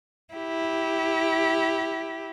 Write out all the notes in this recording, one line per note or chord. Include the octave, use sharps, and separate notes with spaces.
E4 G4